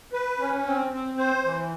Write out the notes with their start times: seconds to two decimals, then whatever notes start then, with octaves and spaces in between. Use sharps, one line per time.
0.13 B4
0.40 C#4
0.66 C4
0.91 C4
1.18 C5
1.44 E3